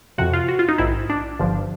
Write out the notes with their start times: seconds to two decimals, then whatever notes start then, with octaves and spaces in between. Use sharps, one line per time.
0.18 F2 C3 F3 F#4
0.33 F4
0.48 F#4
0.59 F4
0.69 D#4
0.78 A#1 G#2 D#3 E4
1.10 D4
1.39 G1 G2 D3 F3